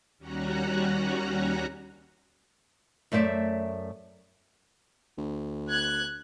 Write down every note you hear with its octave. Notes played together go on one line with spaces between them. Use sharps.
D#2 G3 C#4 F#4 A#5 F#6
F#2 A3 C5 D5 E5
D2
F#6 G#6